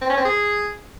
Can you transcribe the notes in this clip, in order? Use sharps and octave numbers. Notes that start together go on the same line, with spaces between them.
C4
C#4
C4
G#4